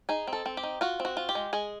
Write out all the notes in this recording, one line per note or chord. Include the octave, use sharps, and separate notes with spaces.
D#4 G#4
C4
A4
C4
G4
D#4
F4 F#4
C4
F#4
F4
G4
G#3
G#3 G#4